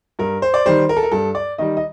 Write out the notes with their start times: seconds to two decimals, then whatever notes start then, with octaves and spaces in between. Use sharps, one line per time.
0.19 G2 A#4
0.42 C5
0.54 D5
0.65 D#3 G3 C5
0.89 A#4
0.97 A4
1.03 A#4
1.11 G2 A4
1.35 D5
1.58 D#3 G3 D#5
1.77 D#5